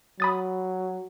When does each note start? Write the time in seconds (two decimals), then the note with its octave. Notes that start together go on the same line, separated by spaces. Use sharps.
0.20 F#3 B5 D#6 A6